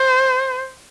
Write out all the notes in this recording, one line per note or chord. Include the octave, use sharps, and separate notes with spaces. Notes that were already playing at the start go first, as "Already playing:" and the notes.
Already playing: C5